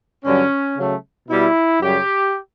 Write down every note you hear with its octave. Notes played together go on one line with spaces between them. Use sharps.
G2 D3 F#3 C#4
C#3 F#3 A3
B2 G3 E4
F#2 C#3 G3 G4